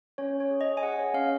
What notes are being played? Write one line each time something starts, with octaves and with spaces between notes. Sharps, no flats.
C#4 C#5
C#5
G#4
D#5
G#5
G#4 F#5
C#5
C#4 F5